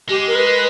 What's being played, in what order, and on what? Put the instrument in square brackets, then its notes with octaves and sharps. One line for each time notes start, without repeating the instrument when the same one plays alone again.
[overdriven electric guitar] G#3 [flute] G4
[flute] A#4
B4